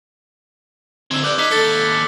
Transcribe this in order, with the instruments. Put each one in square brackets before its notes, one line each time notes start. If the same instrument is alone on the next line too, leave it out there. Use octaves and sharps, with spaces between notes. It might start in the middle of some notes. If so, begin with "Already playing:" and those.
[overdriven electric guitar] D3 C4 [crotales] E6 G#6
[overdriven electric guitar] B4 D5 [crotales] D6 F#6 G6
[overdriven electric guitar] D#4 [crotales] D6 B6
[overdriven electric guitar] D#2 A4 [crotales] A6 C#7